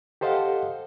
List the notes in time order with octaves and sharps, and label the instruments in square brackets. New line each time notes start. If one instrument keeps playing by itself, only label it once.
[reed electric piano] G4 A4 C5 D#5 F5 F#5